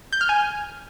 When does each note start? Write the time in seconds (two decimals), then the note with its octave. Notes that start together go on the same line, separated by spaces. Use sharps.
0.13 G6
0.21 F6
0.29 G#5